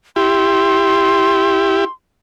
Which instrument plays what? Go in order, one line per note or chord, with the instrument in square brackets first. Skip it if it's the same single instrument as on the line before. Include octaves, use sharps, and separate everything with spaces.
[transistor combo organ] E4 G4 [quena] C6